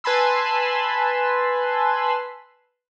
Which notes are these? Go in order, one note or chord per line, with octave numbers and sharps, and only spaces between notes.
B4 G#5 A5 B5 C6 E6